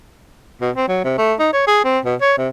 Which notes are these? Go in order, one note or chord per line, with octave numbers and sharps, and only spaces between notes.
B2
C4
F#3
C3
A3
D#4
C#5
G#4
C4
B2
C#5
C3